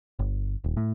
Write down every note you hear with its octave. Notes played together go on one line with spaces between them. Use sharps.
G1
D#1
A2